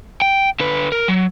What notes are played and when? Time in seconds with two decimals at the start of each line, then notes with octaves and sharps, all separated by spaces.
0.22 G5
0.60 D3 B4
0.92 A#4
1.08 F#3